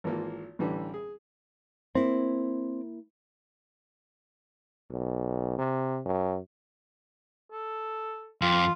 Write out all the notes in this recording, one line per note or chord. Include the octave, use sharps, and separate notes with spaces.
G#1 E3 A#3 F4
A1 D3 E3 G3
G#4
A#3 C4 E4
B1
C3
F#2
A4
F2 F4